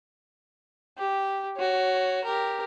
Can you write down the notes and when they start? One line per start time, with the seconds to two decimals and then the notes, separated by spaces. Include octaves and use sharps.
0.98 G4
1.56 F#4 C#5
2.24 G4 A#4